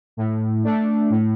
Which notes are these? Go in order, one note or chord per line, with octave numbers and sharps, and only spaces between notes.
A2
A3 D4
A2